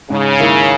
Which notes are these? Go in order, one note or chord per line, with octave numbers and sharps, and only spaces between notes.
G#2 C#3
D#3 A#3 E4 A#4